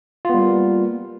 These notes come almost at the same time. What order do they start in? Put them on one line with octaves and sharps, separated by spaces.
F4 B3 G3 A#3